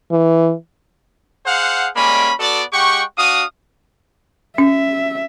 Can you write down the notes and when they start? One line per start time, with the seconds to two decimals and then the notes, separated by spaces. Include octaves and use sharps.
0.12 E3
1.46 G#4 C5 F5 F#5
1.96 G3 G#3 A#3 C#4 D5 B5
2.40 B3 F#4 A4 D5
2.73 G#3 G4 F#5 G5 C#6
3.18 D4 F#4 F5 D#6
4.58 C#4 E5